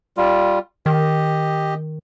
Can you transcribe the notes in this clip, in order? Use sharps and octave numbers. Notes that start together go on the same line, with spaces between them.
G3 F4
D#3 G4 D#5